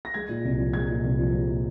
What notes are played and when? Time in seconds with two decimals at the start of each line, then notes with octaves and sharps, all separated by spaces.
0.05 A#6
0.14 G#3 G#6
0.29 A#2
0.45 C2
0.59 F3
0.73 G#3 G#6
0.90 A#2
1.04 C2
1.18 F3
1.34 G#3
1.49 A#2